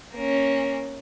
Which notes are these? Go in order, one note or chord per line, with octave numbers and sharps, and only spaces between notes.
A#3 C#4